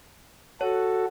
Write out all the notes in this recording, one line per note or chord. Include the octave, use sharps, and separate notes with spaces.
F#4 A4 C#5